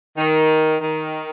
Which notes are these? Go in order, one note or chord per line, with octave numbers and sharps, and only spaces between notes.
D#3
D#3